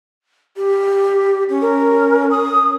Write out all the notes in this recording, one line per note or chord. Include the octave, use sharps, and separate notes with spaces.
G4
C#4
A#4
D#6